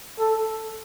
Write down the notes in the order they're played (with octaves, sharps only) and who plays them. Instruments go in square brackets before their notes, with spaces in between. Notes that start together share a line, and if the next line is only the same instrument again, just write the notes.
[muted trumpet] A4